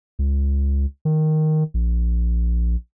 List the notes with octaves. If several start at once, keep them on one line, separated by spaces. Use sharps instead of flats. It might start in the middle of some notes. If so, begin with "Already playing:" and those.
C#2
D#3
A#1